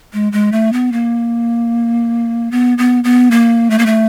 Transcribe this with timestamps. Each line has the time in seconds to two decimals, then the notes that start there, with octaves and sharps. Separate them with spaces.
0.13 G#3
0.32 G#3
0.52 A3
0.73 B3
0.92 A#3
2.51 B3
2.78 B3
3.04 B3
3.31 A#3
3.70 A3
3.78 A#3
3.86 A3